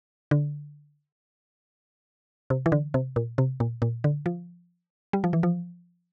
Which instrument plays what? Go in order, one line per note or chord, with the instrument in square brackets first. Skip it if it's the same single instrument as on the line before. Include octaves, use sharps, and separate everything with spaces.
[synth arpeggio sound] D3
C3
E3
D3
C3
A#2
C3
A#2
A#2
D3
F3
G3
F3
E3
F3